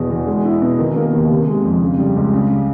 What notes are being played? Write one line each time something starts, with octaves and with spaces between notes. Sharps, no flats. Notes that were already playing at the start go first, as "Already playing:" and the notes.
Already playing: E2 B2
E2
G#3
E4
B2
D#3
A#3
D#2
C3
G#3
F2
C#3
G3
C#2
C#3
G3